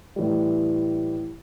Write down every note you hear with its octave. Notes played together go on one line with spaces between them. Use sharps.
A2 E3 G3